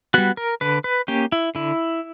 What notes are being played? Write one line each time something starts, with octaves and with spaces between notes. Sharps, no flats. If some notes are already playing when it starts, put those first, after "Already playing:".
G3 B3 F#4
A#4
D3 B4
B4
A#3 C#4 G4
E4
D3 E4